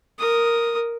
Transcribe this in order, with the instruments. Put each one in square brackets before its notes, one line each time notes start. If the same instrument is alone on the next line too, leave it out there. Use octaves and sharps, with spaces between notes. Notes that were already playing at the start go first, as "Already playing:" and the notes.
[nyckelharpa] A#4 D#6